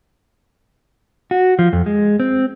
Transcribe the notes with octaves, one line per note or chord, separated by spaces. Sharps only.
F#4
F3
F2
G#3
C4